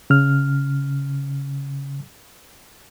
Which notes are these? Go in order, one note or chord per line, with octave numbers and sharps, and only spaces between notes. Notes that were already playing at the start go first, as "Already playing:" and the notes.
C#3 F6